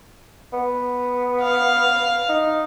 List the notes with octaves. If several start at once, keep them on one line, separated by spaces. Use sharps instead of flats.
B3
F5
D#4